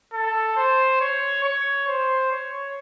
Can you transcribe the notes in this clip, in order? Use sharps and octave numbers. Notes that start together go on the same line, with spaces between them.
A4
C5
C#5
C#5
C5
C#5